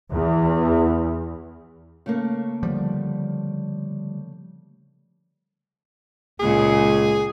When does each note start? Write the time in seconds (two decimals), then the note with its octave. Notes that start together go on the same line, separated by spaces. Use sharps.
0.13 E2
2.06 C#3 A3 A#3
2.63 D3 F3 G3
6.40 C#2 A#2 C#3 G#4